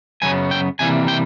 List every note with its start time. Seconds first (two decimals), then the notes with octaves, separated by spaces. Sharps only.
0.22 F#2 C#3 F#3 B3 G#5
0.51 G5
0.79 C3 E3 G3 A#3 G#5
1.08 G5